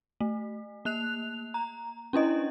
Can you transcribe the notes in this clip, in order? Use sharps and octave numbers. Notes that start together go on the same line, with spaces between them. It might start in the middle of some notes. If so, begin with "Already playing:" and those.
A3
A#3 F#6 F7
A#5
C#4 D4 E4 D#5